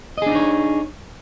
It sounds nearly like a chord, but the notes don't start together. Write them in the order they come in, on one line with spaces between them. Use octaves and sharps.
D#5 G#4 D4 D#4 C#5